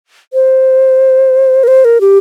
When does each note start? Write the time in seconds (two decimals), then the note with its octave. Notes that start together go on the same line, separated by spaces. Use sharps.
0.33 C5
1.63 A#4
1.68 C5
1.85 A#4
2.01 G4